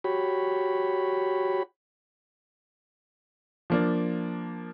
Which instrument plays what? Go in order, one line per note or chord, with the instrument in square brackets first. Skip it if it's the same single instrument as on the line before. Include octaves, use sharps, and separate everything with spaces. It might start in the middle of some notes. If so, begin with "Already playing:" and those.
[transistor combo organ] F#4 G4 C#5 B5
[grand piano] F3 A#3 D4